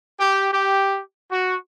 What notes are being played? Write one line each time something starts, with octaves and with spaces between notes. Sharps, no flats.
G4
G4
F#4